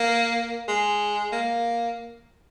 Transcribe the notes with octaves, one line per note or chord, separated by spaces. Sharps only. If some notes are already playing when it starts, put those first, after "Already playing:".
Already playing: A#3
G#3
A#3